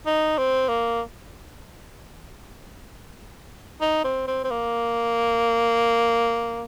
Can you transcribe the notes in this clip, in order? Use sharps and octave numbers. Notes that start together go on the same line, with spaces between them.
D#4
C4
A#3
D#4
C4
C4
C4
A#3